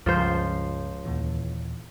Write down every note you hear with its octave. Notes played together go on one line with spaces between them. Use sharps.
C#2 G2 C#3 F3 C5
D#2 A#2 E3